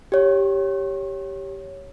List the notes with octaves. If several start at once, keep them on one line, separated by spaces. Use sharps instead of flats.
G4 C#5